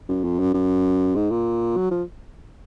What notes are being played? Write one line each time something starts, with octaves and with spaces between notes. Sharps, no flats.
F#2
F2
F#2
F#2
G#2
A#2
F#3
F3